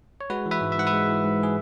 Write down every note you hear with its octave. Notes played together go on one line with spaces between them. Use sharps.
C#5
G#3 F#4 B4
E3
B4 E5
G#2
E5
G#2 F#5
B4 E5
G#3
E3
G#2
G#4